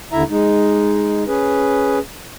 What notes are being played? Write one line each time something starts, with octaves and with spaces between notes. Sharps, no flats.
D#2 D3 E4 E5 A#5
G#3 D#4
C#4 G#4 B4